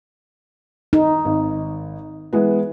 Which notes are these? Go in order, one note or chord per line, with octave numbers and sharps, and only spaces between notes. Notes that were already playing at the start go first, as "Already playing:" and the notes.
D#4
G#1
E3 G#3 B3